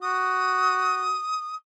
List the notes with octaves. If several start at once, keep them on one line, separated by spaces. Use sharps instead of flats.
F#4 D#6